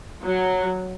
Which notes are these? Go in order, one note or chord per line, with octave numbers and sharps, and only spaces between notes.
F#3